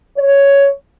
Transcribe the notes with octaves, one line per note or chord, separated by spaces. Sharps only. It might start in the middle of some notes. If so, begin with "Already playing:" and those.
C#5